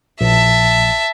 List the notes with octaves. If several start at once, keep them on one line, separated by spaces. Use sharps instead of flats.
A#1 E5 A5